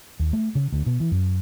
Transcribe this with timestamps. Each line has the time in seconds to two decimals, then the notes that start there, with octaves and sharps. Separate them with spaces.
0.20 D#2
0.33 A3
0.55 C#3
0.72 D2
0.86 B2
1.00 E3
1.12 F#2